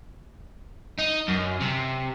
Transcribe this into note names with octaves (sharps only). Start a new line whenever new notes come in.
D#4
F#2
C3